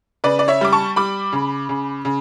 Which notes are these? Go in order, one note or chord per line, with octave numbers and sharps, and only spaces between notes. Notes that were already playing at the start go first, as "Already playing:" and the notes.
C#3 B4 D5
D5
C#5 E5
G3 D6
A5 C#6
G3 B5 D6
C#3
C#3
C#3